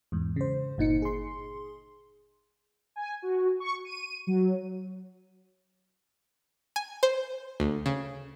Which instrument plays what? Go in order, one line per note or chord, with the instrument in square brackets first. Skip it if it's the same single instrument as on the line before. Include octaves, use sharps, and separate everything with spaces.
[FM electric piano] E2 G#2
C#3 C5
G1 A#2 D#4 C#7
G#4 C6
[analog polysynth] G#5
F#4
C#6
D#7
F#3
[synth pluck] G#5
C5
D2
C#3